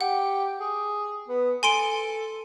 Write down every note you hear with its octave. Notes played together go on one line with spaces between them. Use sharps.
G4 F#5
G#4
B3
A4 G#5 C6 D7